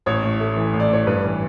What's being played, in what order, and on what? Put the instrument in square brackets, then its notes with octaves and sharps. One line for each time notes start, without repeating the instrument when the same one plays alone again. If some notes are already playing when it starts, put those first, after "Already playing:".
[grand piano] A1 [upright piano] C#5
[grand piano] A2
A3
E3
A1
[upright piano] D5
[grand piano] A2 [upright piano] C#5
[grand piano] G2 [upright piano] B4
[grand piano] E3